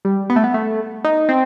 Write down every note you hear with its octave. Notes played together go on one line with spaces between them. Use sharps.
G3
B3
A3
B3
A3
D#4
C4